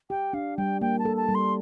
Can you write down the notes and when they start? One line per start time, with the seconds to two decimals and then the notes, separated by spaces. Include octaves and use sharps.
0.10 G4 G5
0.33 D4 F5
0.57 G3 G5
0.81 A#3 G5
0.99 A5
1.05 A4
1.17 A5
1.28 G3
1.35 C6